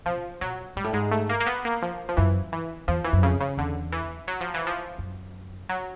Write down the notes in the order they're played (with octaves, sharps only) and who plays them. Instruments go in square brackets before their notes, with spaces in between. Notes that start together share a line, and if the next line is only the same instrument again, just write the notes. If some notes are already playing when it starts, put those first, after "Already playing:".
[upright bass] C3 [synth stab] F3
[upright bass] B2 [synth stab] F#3
[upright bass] G#2 [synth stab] G3
[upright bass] A2
[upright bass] G#2 [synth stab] G#3
[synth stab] A3
A#3
A#3
B3
A#3
F3
F3
[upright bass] F#2 [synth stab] E3
[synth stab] E3
[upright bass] E2 [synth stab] F3
[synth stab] E3
[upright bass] F#2
[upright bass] F2 [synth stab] C#3
[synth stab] C#3
[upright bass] E2 [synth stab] D3
[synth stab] E3
F#3
F3
E3
F3
[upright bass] F#2
[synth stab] F#3